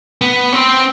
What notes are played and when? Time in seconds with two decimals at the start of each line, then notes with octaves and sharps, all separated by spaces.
0.21 B3
0.53 C4